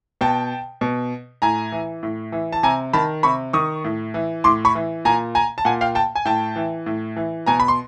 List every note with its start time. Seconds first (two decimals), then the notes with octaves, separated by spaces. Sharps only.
0.21 B2 G5 A5
0.81 B2
1.42 A2 G#5 A#5
1.72 E3
2.03 A2
2.32 E3
2.53 A5
2.63 C3 G#5 A#5
2.93 D#3 A5 B5
3.23 C3 B5 C#6
3.53 D#3 C#6 D#6
3.85 A2
4.14 E3
4.44 A2 C6 D6
4.65 B5 C#6
4.75 E3
5.05 A#2 G#5 A#5
5.35 G#5 A#5
5.58 A5
5.65 A#2 F#5 G#5
5.81 F5 G5
5.95 G5 A5
6.15 G#5
6.25 A2 G5 A5
6.56 E3
6.86 A2
7.17 E3
7.46 B2 G#5 A#5
7.60 B5
7.68 C6